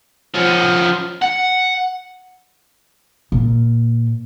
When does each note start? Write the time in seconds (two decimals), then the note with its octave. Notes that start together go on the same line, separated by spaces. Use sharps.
0.34 F3 C#4
1.22 F#5
3.32 A#2